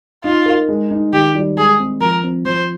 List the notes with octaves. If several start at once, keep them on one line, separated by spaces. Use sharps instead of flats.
D#4 F4
A#4
G#3
D#4
D#3 G4
G3
G#3 G#4
C4
F3 A#4
C4
F3 C5